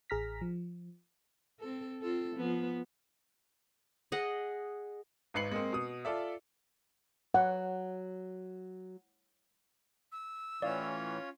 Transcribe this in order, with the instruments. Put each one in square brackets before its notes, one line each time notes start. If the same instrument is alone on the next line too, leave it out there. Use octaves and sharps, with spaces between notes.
[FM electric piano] A1 G#4 A#5 F6 A#6 B6
F3
[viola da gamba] C4 A4
C4 F4 A4
F3 B3
[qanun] G#4 D#5 F#5
[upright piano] G#1 G#2 B4 C7 C#7 F#7
G#3 A#3 C4
B2 D#6
F4 A4 D5 E5
[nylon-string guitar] F#3 [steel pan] F#5
[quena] E6
[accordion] A2 E3 [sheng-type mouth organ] C#4 F4 C#5 [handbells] D5 F5